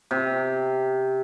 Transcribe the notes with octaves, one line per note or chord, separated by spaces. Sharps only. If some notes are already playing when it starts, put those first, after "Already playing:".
C3